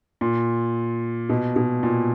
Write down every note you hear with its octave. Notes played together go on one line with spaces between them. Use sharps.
A#2
B2
B2
A#2